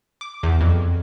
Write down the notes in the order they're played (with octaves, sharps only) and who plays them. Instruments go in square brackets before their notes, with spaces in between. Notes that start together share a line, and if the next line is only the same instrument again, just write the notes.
[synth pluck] D6
E2
F2